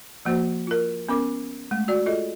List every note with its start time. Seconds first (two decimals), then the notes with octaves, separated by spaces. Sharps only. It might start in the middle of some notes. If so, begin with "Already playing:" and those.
0.25 F3 A#3 F#4 C5
0.67 F4 A#4
1.08 B3 C#4 A#4 D6
1.71 G#3 A3
1.88 F#4 D5
2.06 F4 G#4 A4 D#5